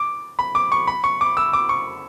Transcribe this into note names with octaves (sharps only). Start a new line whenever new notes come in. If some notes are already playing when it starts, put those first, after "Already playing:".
Already playing: D6
B5
D6
C#6
B5
C#6
D6
E6
D6
C#6